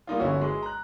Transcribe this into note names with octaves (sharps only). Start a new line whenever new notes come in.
G3 A#3 D#4 F4
G1 C#4 E4 F#4 C#5
G#3
A#5 F#6